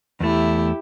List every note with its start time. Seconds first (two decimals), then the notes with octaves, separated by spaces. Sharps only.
0.20 E2 A3 E4 G4